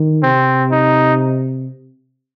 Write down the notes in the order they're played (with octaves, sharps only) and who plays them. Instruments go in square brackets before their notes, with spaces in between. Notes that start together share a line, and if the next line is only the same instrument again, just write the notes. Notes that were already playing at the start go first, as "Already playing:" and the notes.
Already playing: [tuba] D#3
[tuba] C3 [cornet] C4
[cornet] D#4